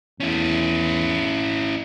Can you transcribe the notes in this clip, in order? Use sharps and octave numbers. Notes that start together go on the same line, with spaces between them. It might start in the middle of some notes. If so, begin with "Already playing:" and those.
E2 C#4 E4